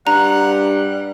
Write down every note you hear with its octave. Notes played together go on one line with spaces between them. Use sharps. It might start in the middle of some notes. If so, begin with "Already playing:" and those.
G2 G3 F#5 A#5